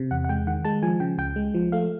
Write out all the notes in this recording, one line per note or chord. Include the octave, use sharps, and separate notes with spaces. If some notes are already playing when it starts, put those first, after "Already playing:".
Already playing: C3
E2 F#5
F#5
G#3 G5
D#3 F#5
G#3 A5
F3 G#5
C#3 G5
C#2 G5
G#3
F3
A3 F5